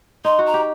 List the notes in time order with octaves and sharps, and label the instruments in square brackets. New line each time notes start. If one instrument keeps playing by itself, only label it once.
[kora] D#4 [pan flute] C6
[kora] F#4
[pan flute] A#5
[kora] G4